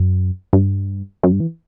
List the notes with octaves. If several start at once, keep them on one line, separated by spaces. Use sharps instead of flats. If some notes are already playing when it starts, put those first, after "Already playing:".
Already playing: F#2
G2
F#2
G2
E3